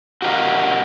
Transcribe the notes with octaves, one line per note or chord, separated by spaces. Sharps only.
F#4 G4 A#4 C#5 D#5 F5